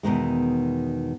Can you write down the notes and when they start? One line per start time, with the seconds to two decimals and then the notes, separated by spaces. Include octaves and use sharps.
0.03 E2 B2 D#3 G#3